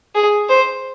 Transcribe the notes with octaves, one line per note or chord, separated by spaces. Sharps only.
G#4
C5